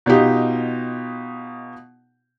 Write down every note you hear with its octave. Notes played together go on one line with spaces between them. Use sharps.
B2 D#4 F4 G4